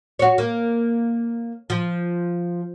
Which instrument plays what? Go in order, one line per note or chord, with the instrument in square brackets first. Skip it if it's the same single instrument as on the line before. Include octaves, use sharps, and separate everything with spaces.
[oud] F#4 C#5
A#3
F3